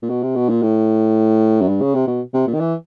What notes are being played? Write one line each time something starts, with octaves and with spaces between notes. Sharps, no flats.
A#2
B2
C3
B2
A#2
A2
F#2
G2
C#3
C3
B2
C3
A#2
D#3
E3